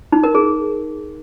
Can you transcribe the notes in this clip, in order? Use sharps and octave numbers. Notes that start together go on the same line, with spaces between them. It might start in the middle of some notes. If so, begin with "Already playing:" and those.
D#4
A#4
G#4